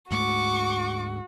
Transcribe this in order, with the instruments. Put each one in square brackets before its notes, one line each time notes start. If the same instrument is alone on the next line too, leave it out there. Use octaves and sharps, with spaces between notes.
[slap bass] D2 G#2 A3 [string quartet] F#4 [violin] C#6 D6